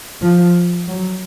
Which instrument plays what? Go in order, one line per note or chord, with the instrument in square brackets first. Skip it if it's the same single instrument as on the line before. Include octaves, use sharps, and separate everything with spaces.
[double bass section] F3
F#3